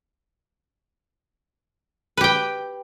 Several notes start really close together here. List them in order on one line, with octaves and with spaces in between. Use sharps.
B4 G4 G5